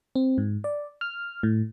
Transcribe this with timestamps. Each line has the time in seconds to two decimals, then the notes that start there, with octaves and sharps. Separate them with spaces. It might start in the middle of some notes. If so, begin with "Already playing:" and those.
0.15 C4
0.38 G#2
0.64 D5
1.01 F6
1.43 A2